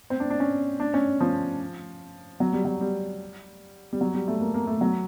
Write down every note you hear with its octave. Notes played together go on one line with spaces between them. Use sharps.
C4
D4
D4
C#4
D4
C#4
F3
F#3
G3
F#3
G3
G3
F#3
G3
A3
A#3
A#3
A3
F#3